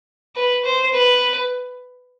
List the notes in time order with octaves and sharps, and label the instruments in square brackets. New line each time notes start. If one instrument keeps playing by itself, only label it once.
[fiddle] B4
C5
B4